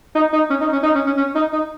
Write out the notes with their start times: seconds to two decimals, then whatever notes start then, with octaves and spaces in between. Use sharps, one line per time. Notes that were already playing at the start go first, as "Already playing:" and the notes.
0.16 D#4
0.33 D#4
0.50 C#4
0.61 D#4
0.73 C#4
0.84 D#4
0.95 C#4
1.07 C#4
1.18 C#4
1.35 D#4
1.53 D#4